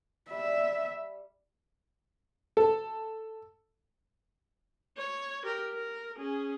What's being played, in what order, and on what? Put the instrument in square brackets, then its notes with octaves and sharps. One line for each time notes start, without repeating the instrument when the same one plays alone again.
[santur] G3 [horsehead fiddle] E5
[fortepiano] A4
[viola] C#5
G4 A#4
A#4
C#4 G#4